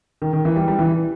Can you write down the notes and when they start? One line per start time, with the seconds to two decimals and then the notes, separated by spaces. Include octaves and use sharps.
0.22 D#3
0.33 D#3
0.45 E3
0.56 G3
0.68 G3
0.79 E3